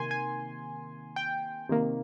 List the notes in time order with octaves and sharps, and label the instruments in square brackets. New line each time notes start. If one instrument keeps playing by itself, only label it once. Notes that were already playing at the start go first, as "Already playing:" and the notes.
Already playing: [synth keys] C3 D#3 A#3 G#5 C6
G#5
G5
C3 D#3 A#3